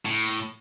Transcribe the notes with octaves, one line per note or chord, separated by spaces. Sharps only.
A2